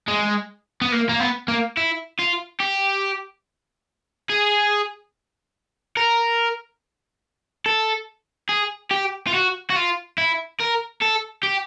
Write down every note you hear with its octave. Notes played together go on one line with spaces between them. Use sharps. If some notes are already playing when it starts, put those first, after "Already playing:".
G#3
B3
A#3
A#3
B3
A#3
E4
F4
G4
G#4
A#4
A4
G#4
G4
F4
F#4
F#4
F4
E4
A#4
A4
G4